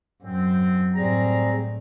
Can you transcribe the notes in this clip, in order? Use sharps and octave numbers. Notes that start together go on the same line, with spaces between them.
F#2 C4
A2 G3 C4 G#4 A#5